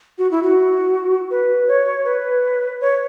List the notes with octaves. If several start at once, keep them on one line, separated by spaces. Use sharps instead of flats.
F#4
E4
F#4
B4
C#5
B4
C#5